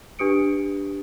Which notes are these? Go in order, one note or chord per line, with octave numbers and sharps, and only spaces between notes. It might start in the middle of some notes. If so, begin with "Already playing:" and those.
D4 G4 B4 D#6 C#7 D7